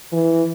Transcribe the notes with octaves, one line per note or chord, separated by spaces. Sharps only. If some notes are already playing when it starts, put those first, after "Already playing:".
E3